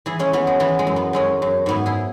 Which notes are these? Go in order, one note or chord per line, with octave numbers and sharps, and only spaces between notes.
E3 E4 G#4
G#3 C#4
E3 B3
G#3
E3 B3
G#3
F#2
B3
F#2 G#3 C#4
F#2
G#2 B3 E4
E4 G#4